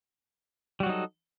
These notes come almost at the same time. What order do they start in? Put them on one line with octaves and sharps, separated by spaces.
G3 F#4 F#3 D#4 A4